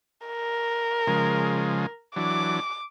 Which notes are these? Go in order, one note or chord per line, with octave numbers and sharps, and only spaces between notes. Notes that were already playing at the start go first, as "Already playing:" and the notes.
A#4
C#3 F3 G#3
E3 F#3 D4 D6